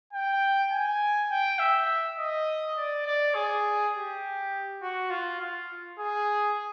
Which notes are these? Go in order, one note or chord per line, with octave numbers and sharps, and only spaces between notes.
G5
G#5
G5
E5
D#5
D5
D5
G#4
G4
F#4
F4
F4
G#4